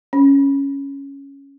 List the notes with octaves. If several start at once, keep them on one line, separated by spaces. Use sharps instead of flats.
C#4